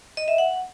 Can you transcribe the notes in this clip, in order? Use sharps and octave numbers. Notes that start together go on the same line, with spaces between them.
D#5
E5
F#5